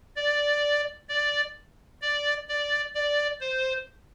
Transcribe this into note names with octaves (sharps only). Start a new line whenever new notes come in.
D5
D5
D5
D5
D5
C5